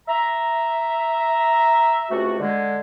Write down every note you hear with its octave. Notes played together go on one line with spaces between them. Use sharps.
E5 A#5
C#2 C3 A3 F#4
D3 G#3